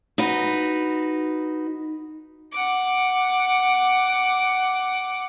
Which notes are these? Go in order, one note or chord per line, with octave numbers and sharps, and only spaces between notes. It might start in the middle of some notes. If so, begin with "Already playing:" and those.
D#4 F#4 B4
F#5 D6